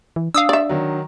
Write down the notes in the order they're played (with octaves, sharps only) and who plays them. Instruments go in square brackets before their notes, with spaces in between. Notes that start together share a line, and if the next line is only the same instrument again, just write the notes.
[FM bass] E3
[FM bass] D4 [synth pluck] F5 D#6 E6
[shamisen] D5 E5
[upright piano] D#3 F#3